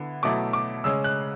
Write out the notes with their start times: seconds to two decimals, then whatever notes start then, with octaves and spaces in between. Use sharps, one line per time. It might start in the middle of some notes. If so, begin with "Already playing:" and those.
Already playing: D3 B3 E4
0.23 B2 F#3 A3 E4 D6
0.53 D6
0.84 C#3 G#3 C#4 E6
1.04 F#6